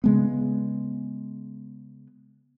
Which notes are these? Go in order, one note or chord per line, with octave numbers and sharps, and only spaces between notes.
C#3 G#3 B3